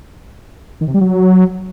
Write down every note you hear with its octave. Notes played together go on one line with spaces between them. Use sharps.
D#3
C3
G3
F#3